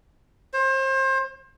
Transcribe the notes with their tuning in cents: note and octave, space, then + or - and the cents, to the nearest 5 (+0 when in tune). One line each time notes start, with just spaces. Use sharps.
C5 +30